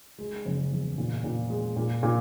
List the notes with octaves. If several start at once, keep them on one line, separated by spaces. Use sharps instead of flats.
G#3
F#1
E2
A#2
A#2
G#3
A#2
A#2